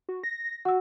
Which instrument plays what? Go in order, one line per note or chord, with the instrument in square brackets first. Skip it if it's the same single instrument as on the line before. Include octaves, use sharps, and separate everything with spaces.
[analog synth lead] F#4
A#6
[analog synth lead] F#4 [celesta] F#5 E6